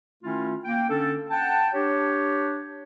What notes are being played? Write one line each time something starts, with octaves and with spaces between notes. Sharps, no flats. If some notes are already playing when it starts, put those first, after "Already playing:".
D#3 A3 C#4 E4 F4
A#3 G5
D3 C#4 D4 A4
F#5 G5 A5
D4 G4 C#5